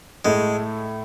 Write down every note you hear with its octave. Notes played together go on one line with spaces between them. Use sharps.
A2 G#3 A3